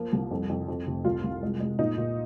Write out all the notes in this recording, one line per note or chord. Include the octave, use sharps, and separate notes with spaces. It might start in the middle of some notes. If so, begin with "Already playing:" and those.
Already playing: F3 A#3
C2
F2
F2
F2
F1
C2 F4
C2
G#3
G#3
A#2 D#4
A#2